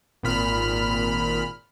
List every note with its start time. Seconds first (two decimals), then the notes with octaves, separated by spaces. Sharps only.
0.23 G#1 A#2 B5 F6